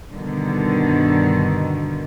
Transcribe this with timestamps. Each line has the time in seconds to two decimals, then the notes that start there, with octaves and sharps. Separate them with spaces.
0.12 G2 B2 D3 D#3